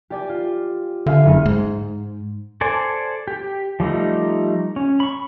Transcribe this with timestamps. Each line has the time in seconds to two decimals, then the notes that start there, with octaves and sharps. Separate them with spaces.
0.10 G4 D5 G#5
0.29 F4
1.06 D3 E5 F5 G#5
1.25 F#1 E5 D#7
1.46 G#2
2.61 A4 C5 D5 G#5
3.28 G4
3.80 F3 G3 A3 D#4
4.76 C#4
5.00 B5 C#6